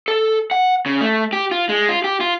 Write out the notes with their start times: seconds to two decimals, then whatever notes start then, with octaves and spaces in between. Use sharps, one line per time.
0.08 A4
0.51 F#5
0.86 C#3
1.01 A3
1.33 G4
1.51 F4
1.69 G#3
1.89 F4
2.04 G4
2.21 F4